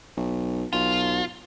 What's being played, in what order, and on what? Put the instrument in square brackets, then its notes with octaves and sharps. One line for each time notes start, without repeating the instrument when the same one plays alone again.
[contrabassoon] B1
[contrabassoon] B1 [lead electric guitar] F4